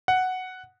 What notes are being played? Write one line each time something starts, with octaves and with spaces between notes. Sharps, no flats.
F#5